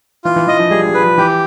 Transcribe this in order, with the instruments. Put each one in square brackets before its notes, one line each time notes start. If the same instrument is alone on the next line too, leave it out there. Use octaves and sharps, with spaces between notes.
[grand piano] E3 [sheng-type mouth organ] F4
[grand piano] E3
[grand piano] E3 [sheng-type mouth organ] D#5
[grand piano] F3
[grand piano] G3 [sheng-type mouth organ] G#4
[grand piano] G3
[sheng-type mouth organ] B4
[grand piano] F3
[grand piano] E3 [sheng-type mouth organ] G4